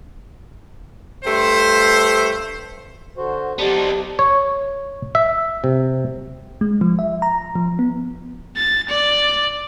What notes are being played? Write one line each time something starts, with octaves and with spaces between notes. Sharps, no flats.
G2 A3 C5
D3 F#4 C5
B3 D#4 G4 C5 D5 A5
C#5
E5
C3
G#3
F3
E5
A#5
F3
B3
A6
D5